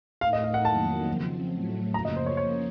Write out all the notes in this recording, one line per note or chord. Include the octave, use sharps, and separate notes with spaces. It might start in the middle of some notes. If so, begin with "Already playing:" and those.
A2 A3 D#4 A#4 F5
D#5
F5
F#5
F2 D#3 F#3 A#3 A5
C#3 F3 C4
A2 F#3 A3
F#2 C#3 F3 A#3 A#5
D#5
C5
C#5
F3 A#3 C#4 C#5